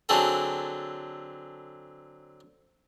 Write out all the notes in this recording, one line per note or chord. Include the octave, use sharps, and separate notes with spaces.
D3 F#3 C4 G#4 A4